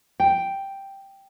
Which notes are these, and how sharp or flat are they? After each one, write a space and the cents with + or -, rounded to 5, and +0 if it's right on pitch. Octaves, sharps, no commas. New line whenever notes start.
G5 +0